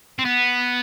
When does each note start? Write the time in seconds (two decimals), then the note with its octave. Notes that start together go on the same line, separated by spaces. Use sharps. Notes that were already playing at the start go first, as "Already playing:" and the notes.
0.19 C4
0.25 B3